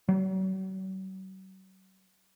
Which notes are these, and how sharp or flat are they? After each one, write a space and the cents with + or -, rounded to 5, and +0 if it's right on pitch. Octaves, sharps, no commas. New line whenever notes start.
F#3 +40